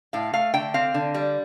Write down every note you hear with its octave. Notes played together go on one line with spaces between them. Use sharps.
A2 F5
A3 F5
D3 G5
C4 F5
D3
G3